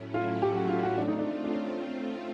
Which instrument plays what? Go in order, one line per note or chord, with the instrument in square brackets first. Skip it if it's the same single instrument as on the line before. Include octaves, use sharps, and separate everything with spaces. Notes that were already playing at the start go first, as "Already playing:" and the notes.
Already playing: [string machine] A2 F#3 A3 C#4 E4
[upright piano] F4
G4
F#4
F4
F#4
[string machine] A3 C4 F4 [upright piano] D4
[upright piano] D#4
D4
D4
C#4